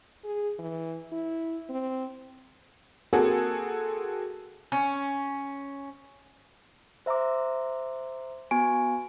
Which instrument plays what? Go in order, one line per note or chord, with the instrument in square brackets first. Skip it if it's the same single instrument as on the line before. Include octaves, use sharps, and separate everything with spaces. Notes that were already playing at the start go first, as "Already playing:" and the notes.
[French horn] G#4
E3
E4
C4
[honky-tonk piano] A#3 C4 F#4 G#4 A4
[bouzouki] C#4
[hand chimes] C5 E5 A#5 C6 D6
B3 F#4 G#5 C#6 D7